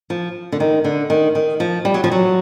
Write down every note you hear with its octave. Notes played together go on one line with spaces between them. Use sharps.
F3
D3
D#3
D3
D#3
D#3
F3
G3
F#3
F3
F#3